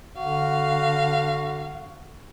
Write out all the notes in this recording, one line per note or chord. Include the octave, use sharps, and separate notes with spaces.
D3 F#4 F5